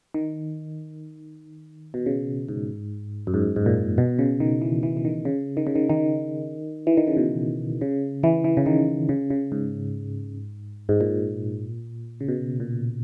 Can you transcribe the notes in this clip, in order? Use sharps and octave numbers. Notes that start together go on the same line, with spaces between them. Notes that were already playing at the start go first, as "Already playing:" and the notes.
D#3
B2
C#3
G#2
F#2
G#2
G#2
A#2
B2
C#3
D#3
E3
E3
E3
D#3
C#3
D#3
C#3
D#3
D#3
E3
D#3
C#3
B2
C#3
E3
E3
C#3
D#3
C#3
C#3
G#2
G#2
A#2
C#3
B2
A#2